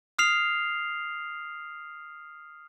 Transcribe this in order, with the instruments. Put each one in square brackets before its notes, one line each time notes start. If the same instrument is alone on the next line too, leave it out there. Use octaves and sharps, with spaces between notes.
[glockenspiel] D#6 F6 C7 F7